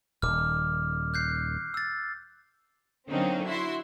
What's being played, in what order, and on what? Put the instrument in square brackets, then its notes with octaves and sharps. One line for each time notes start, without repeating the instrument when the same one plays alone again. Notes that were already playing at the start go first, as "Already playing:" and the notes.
[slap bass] D#1 D#3 [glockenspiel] D6 F6
[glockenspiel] F#6 G6 C7
E6 A6
[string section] D3 F#3 A#3 C4 C#4 D#4
E4 F#4 E5 C6